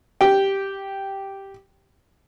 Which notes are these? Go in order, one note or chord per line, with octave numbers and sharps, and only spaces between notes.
G4 G5